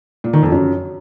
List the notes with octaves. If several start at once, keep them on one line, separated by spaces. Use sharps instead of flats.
A#2
D#3
F2
F#2